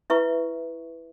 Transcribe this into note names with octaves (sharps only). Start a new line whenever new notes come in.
E4 B4 E5 C#6